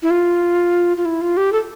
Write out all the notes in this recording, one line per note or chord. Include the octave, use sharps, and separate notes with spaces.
E4
F4
F4
E4
F4
G4
A4